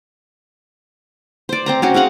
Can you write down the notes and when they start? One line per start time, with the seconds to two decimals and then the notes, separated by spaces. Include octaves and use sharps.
1.49 C5 D5
1.66 C4 C5 A#5
1.82 C4 C#4 F#4
1.94 C4 G#4 F5 F#5